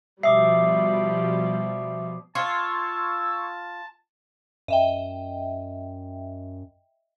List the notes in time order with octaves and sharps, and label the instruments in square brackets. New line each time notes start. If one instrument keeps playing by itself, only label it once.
[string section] B2 F3 G3 [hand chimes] E5 [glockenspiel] D6 D#6 C7
[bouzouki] F4 [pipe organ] A5 [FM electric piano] C6 C#6 G#6 [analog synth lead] E6
[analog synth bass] F#2 [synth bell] D#5 E5 G5